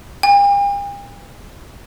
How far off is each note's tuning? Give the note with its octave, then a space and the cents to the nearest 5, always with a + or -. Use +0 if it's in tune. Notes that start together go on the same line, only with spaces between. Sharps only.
G5 +45